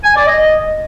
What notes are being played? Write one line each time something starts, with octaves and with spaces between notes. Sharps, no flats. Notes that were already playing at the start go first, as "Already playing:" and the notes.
G#5
D5
D#5